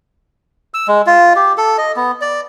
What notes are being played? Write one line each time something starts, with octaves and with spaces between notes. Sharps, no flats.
E6
G#3
F4
G4
A4
D#5
B3
D5